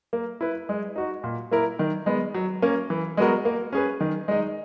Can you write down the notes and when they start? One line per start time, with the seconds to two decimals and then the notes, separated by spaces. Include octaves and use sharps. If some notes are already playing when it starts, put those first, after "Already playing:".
0.13 A#3
0.41 E4 B4
0.69 G#3
0.96 D#4 F#4
1.24 A#2
1.51 A#3 E4 A#4
1.79 D#3
2.06 G#3 B3
2.34 F#3
2.62 A#3 C#4
2.90 E3
3.17 G#3 B3 F#4 A#4
3.45 A#3
3.72 C#4 G#4 B4
4.00 D#3
4.28 G#3 D#4